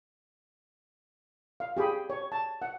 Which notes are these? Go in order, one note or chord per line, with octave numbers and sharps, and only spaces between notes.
F5
G4 G#4 G5 B5
C#5
A5
F#5